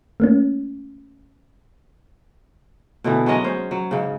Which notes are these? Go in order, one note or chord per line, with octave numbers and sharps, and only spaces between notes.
A3 A#3 C#4
B2 D3 E3 B3
F#3 G#3 C#4 D#5
C#4 C5
F#3
G#2 C#3